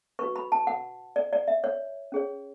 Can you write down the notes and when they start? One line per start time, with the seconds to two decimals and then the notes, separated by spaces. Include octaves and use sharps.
0.19 F#4 B4 C#6
0.36 B5
0.52 A5
0.67 F#5
1.16 D5
1.33 D5
1.48 E5
1.64 C#5
2.12 C#4 G#4 C#5